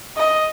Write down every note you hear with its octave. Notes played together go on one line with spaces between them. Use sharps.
D#5